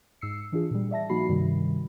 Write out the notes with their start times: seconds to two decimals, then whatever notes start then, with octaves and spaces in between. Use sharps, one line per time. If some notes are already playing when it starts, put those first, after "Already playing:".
0.21 G#2 E6 C7 C#7
0.52 E3 D4 F4 G#4
0.71 A#2 G3
0.91 D5 E5 A5 A#6
1.09 F3 A#3 D#4 F#4 B5 C7
1.29 G2 C3 D#3 G3